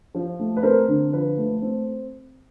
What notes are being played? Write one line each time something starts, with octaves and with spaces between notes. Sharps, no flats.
F3
A3
B4
C4 A#4 C5
D3
F3 B4
A3
C4